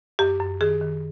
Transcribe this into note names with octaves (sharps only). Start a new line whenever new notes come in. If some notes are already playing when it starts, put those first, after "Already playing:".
F#2 G4
F#2
D#3 G#4
D#3